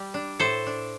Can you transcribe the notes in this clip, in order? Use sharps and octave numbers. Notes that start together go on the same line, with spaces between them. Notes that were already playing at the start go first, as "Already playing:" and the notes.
Already playing: G3
D4
A2 A4 C5
D4